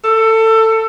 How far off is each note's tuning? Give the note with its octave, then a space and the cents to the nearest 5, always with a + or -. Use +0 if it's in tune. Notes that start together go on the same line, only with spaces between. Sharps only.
A4 +20